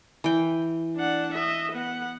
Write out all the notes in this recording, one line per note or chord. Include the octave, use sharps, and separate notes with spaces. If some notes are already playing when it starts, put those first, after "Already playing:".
E3 G5
D4 F#5
D#5 E5
B3 F#5